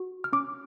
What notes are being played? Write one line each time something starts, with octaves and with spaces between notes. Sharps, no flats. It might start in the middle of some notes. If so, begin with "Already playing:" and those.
Already playing: F#4
F6
C#4 D6